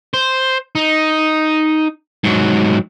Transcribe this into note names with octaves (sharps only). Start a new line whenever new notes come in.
C5
D#4
G#2 F#3